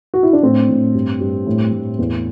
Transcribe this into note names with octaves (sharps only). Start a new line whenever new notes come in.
F#4
E4
D4
A2 C4
A2
G2
G2
A2
A2
E2